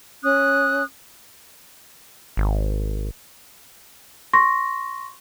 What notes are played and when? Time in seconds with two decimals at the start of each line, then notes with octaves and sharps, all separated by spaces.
0.23 C#4 D#6 F#6
2.37 G#1
4.33 C6 C#6 A#6